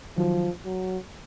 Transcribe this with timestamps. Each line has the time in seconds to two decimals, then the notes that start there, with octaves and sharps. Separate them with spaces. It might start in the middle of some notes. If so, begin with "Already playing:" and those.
0.18 D#3 F3 F#3
0.65 F#3